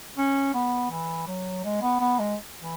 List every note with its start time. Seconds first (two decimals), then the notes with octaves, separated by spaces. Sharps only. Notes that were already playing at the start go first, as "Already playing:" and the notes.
0.18 C#4
0.54 B3
0.90 E3
1.27 F#3
1.64 G#3
1.82 B3
2.00 B3
2.19 G#3
2.61 E3